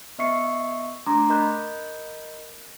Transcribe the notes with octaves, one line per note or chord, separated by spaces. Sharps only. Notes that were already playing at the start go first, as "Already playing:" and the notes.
B3 D#5 E5 C#6 C7 C#7
A3 D4 A#5 C6 D6
A#4 D#5 B5 F#6 G6